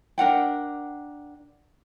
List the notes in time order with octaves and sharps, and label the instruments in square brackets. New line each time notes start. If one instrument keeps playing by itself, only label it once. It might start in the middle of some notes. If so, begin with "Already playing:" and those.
[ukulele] D4 A#4 F#5 G5